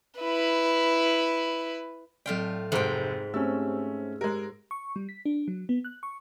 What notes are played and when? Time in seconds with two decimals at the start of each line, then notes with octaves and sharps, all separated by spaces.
0.20 E4 B4
2.26 A2 F#3 F4 D5 G5
2.72 F1 G#2 A4 C5 G5
3.34 A3 C4 C#4 G4 C5 E6
4.21 G#3 G4 A#4
4.71 C#6
4.96 G3
5.09 B6
5.25 D4
5.48 F#3
5.69 B3
5.85 F#6
6.03 C#6